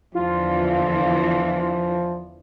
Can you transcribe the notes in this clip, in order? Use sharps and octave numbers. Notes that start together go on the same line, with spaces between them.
E2 D3 E3 F3 F4